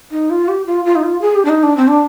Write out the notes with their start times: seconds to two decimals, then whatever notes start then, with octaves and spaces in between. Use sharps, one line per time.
0.11 D#4
0.30 F4
0.48 G4
0.66 F4
0.85 F4
0.95 D#4
1.03 F4
1.21 G#4
1.35 G4
1.45 D4
1.49 D#4
1.63 D4
1.77 C4
1.88 D4